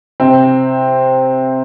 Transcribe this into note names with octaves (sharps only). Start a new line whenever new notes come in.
C3 C4